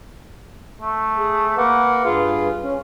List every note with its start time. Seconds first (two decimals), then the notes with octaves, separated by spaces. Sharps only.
0.81 A3
1.18 G#4
1.57 A#3 B4 F#5
2.05 G2 F4 G#4 B4
2.63 C#4